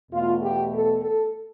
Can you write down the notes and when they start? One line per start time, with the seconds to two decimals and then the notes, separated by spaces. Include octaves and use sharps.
0.12 E2 B2 A3 F4
0.41 G4
0.71 A4
1.00 A4